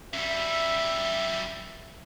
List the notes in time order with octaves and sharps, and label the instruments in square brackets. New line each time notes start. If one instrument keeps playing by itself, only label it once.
[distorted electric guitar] F#2 G3 [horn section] E5